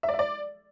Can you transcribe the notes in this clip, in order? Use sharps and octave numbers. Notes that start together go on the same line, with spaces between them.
E5
D5
E5
D5